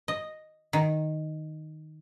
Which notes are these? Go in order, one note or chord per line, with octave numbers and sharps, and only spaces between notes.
D#5
D#3